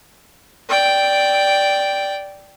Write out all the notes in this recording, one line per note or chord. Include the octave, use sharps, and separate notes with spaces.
D5 G5